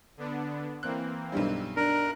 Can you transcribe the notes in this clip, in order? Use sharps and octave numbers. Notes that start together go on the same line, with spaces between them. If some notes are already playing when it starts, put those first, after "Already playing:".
D3 B3 D4
E3 A#3 C4 F#6
B1 G2 G3
D4 A#4 F#6